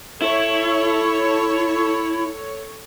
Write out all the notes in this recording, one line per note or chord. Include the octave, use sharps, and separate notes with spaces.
E4 A4 C#5